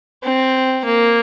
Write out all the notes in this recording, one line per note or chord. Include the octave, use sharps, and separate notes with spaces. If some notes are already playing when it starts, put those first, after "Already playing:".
C4
A#3